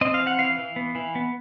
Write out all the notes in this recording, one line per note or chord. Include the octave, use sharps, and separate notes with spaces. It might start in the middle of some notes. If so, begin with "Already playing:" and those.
C4 D#5
F5
E3
F#5
E3 F5
E3
B3
E3
B3